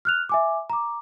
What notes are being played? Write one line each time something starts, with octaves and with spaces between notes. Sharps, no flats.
F6 F#6 F7
E5 G#5 D6
A#5 D6